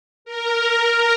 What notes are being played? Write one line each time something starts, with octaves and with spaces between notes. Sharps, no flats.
A#4